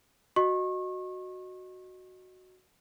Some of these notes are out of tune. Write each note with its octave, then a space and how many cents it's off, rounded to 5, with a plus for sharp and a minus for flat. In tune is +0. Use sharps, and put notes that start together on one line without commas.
F#4 +0 D#5 -15 C#6 -35